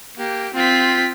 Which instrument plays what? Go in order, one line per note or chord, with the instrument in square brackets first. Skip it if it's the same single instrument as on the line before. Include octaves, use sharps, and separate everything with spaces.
[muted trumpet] A#3 [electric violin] G4
[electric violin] C4 B6 [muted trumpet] F4